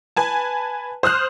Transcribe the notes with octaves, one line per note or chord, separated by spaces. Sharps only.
B4 G#5 A5
C5 D#6 F6 F#6